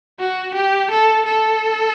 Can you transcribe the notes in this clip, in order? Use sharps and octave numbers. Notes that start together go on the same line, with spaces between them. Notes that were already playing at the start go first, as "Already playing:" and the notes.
F#4
G4
A4
A4